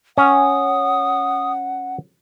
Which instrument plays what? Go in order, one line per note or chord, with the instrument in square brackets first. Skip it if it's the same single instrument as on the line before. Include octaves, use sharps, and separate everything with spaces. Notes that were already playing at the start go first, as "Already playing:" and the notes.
[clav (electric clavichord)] C#4 [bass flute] F#5 [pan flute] D#6